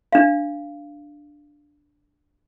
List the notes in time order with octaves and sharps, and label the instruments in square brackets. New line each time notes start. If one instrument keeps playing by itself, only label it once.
[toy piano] D4 F5